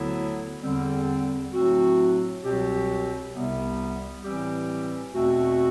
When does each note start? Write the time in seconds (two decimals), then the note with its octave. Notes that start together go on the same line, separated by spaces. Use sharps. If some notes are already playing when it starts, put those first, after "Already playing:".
Already playing: D2 D3 F#3 B3 E4
0.62 E2 D3 G3 C4
1.53 A2 F#3 A3 C4 F#4
2.43 C2 B2 F#3 C4 G4
3.32 C2 C3 G3 B3
4.23 A2 E3 G3 C4 G4
5.13 E2 B2 A3 C4 F#4